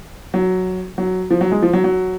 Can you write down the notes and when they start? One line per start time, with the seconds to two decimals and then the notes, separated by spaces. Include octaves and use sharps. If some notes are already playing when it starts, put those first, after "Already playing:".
0.34 F#3
0.98 F#3
1.31 F3
1.41 F#3
1.52 G#3
1.62 F3
1.73 F#3
1.84 F#3